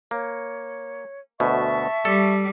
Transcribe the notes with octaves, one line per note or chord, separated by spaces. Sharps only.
A#3 C#5
D2 B2 E5 A5 C#6
G3 A4